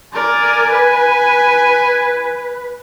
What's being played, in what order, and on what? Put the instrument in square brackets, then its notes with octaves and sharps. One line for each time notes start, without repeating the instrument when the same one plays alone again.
[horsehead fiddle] A#4 D5 [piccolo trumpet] G#5
[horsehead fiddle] B4